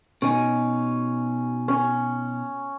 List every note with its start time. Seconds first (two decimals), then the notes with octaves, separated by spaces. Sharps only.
0.22 B2 C#4 D#4
1.68 C#4